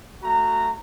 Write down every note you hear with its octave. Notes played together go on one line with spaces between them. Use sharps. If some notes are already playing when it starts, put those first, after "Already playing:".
A3 F#4 A#5